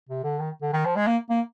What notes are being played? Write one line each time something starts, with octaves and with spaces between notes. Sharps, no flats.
C3
D3
D#3
D3
D#3
F3
G#3
A#3
A#3